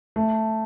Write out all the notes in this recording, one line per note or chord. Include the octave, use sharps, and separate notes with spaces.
A3